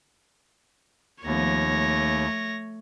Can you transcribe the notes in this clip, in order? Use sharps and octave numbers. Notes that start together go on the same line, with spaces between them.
D#2 F3 A3 B3 C#5 A#6
A3